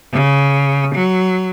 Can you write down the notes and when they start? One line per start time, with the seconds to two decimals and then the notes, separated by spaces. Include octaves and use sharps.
0.13 C#3
0.95 F#3